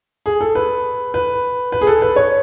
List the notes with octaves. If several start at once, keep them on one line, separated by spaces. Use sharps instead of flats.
G#4
A4
B4
B4
B4
G#4
A4
B4
C#5